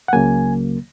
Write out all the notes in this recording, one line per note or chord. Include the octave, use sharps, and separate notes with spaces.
F#5
C#2 C#3 F#3 A#3 G#5